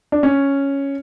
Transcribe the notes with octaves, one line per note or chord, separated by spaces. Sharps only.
D4
C#4